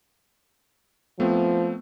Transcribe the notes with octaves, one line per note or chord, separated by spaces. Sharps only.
F3 A3 B3 C4